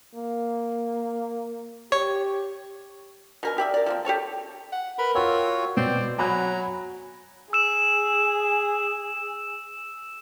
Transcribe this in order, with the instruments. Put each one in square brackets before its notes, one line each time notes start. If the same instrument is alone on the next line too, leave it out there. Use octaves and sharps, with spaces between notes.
[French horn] A#3
[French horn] G4 [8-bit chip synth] C#5
[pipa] B2 A#4 G#5
G4 D5 E5
A#4 D5
F3 A#3 C4
G4 A4 C#5 A5
[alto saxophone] F#5
[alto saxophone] A#4 [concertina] B4 B5
[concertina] F4 F#4 C#5 [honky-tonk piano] G5 E6
[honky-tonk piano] B2 [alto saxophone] C4 [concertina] D5
[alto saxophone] F#3 [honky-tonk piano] G#5 B5 F#6 [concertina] A#5
[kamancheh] G#4 [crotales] E6 E7